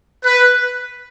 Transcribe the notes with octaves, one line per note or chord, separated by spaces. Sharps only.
B4